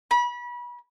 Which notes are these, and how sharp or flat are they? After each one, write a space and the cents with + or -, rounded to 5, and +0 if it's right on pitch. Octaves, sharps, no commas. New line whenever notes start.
B5 -30